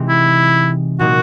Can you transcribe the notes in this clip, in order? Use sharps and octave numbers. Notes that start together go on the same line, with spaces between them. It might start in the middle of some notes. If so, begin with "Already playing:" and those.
Already playing: C3 E3 G#3 C4 D#4
E4
A#2 F#3 A#3 D#4 F#4